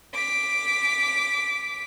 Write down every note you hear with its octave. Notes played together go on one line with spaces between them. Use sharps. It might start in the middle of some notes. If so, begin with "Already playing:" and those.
D6 B6